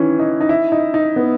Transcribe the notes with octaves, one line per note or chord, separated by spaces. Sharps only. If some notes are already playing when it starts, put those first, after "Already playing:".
Already playing: D#3 E3 C#4
D#4
D#4
E4
D#4
D#4
B3